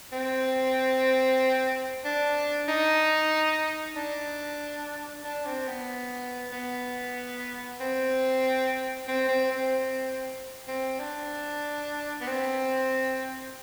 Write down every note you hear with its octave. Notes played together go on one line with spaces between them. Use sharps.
C4
D4
D#4
D4
D4
C4
B3
B3
C4
C4
C4
C4
C4
D4
B3
C4